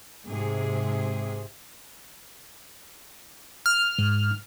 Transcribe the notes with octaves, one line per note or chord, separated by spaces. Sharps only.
G#2 C3 G#4
F6
G#2